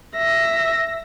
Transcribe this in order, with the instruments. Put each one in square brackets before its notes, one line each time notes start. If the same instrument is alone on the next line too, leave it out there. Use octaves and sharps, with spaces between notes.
[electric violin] E5 A#6